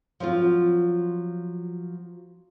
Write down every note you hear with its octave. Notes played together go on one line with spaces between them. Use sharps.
F3 F#3 C4 F4